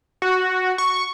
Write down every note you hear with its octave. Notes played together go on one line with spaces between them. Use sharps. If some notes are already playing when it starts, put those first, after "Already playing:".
F#4
C#6